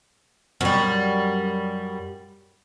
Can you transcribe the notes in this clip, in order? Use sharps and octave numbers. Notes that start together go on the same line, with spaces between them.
F#2 G3